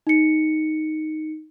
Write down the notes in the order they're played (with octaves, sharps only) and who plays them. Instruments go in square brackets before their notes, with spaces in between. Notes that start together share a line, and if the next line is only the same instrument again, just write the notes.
[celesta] D#4 C#7